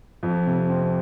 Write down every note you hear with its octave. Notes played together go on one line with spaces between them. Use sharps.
F2
C3
C4